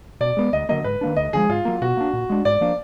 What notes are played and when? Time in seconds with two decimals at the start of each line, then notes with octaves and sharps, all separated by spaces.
0.20 B2 D5
0.37 G#3 B3
0.53 D2 D#5
0.69 D3 F#3 A#3 D#5
0.84 G#2 B4
1.01 D#3 A#3 D4
1.16 D2 D#5
1.33 D3 F3 G#3 G#4
1.49 G#2 F4
1.65 F#3 A#3
1.82 B2 F#4
1.97 A#3 D4
2.13 A#2
2.30 G#3 D4
2.45 G#2 D5
2.61 F3 A#3 D4